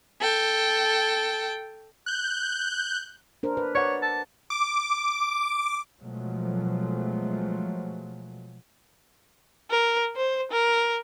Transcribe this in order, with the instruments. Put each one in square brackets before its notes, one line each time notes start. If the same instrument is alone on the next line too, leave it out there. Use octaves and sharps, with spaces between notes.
[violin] A4 G5
[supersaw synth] F#6 G6
[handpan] D4 A#4 C5
B4
[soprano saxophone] C#5 [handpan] D5 F#5
[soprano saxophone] A5
[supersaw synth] D6
[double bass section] B2 F3 F#3 G#3 A3
[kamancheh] A#4
C5
A#4